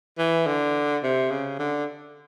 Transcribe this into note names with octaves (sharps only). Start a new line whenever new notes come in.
E3
D3
C3
C#3
D3